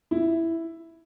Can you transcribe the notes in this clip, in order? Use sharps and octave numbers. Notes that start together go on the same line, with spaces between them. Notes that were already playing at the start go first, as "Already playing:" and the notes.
E4